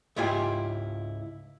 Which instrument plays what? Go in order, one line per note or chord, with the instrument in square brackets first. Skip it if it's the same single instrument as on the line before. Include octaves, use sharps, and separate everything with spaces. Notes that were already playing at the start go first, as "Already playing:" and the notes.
[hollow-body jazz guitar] C#2 G#2 E4 F4 G4 G#5